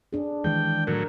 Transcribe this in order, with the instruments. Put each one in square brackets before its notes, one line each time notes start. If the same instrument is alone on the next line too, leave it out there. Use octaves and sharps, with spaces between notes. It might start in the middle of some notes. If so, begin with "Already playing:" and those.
[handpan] D4 G#4
[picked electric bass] D#3 E3 G#3 [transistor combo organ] G5
[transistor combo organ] A2 F#3 [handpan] A#4